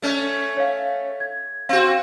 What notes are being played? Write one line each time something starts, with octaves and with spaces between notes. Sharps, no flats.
A3 C#4
C#5 F5
G#6
C4 F#4 F5